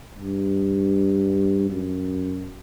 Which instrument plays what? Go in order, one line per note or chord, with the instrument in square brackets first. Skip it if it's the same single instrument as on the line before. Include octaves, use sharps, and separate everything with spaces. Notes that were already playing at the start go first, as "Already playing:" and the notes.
[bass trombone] G2
F#2